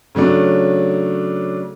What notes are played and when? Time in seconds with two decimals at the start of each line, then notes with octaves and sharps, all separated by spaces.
0.15 C#3 F#3 A3 D4